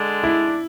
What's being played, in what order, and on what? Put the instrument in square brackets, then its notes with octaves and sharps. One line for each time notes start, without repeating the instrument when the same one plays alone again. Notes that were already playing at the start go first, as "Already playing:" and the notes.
Already playing: [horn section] D3 G#3 D4
[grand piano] E4